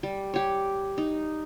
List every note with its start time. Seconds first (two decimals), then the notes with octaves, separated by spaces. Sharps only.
0.03 G3
0.34 G4 C#5
0.98 D#4